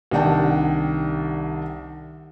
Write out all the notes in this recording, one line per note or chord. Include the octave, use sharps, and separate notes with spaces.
C2 D#3 D4 F#5 G5 A5